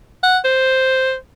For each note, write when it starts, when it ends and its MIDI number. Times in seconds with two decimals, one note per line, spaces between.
0.23 0.38 78
0.44 1.15 72